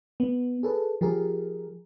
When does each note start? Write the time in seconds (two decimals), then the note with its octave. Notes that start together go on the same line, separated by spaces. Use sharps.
0.20 B3
0.63 G#4 A4 B4
1.01 F3 G4 G#4 A#4